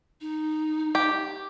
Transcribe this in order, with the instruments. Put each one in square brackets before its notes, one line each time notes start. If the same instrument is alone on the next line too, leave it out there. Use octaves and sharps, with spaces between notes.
[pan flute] D#4
[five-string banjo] G4